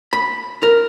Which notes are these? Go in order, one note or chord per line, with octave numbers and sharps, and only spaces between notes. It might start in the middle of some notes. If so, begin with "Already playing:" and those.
B5
A#4